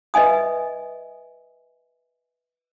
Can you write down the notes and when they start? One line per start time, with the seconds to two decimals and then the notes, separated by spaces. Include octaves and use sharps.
0.14 B4 D#5 E5 G#5 D#6